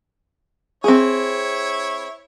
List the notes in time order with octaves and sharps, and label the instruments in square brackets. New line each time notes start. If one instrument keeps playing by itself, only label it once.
[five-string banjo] C4 G#4 [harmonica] E4 C#5